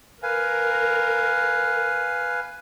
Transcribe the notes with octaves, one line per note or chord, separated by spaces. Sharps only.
A#4 B4 F5 G#5